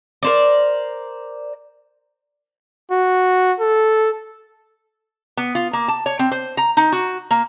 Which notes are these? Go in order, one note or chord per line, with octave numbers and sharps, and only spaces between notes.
A#4 C5 D5
F#4
A4
B3
F4
A#3
A5
C#5
C4
C5
A#5
D#4
F#4
A#3